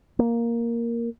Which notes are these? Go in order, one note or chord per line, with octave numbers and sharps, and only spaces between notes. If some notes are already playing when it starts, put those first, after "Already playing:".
A#3